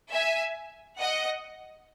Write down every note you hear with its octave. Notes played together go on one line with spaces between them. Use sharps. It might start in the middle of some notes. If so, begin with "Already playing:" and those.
E5 G#5
D#5 F#5